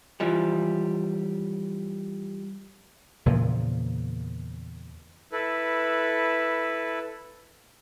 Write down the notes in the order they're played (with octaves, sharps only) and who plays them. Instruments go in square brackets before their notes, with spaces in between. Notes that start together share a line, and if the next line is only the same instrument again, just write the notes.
[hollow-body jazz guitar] E3 F3 G3
[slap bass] E2 A#2 C#3 F3
[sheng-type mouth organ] E4 A4 B4